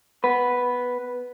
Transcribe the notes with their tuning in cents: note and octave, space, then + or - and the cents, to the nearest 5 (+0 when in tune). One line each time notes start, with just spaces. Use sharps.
B3 +0 B4 +0